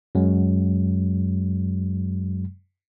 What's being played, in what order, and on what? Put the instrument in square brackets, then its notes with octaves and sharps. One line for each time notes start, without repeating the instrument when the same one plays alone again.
[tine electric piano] F#2 F#3 G#3